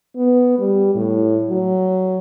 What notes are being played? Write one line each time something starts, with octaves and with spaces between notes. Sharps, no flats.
B3
G3
A2
F#3